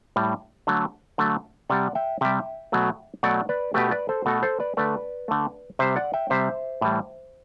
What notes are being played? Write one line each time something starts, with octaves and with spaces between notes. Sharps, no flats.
A2 G3
D3 F#3 A3
D3 F#3 A3
C3 G3 D5 F#5
E5 G5
C3 G3 E5 G5
B2 F#3 A3
B2 F#3 A3 D5 F#5
B4 D5
B2 A3 G4 B4
B4 D5
A4 C5
B2 A3 F#4 A4
A4 C5
B4 D5
D3 A3 B4 D5
D3 A3
C3 G3 C5 E5
D5 F#5
E5 G5
C3 G3 C5 E5
A2 E3 G3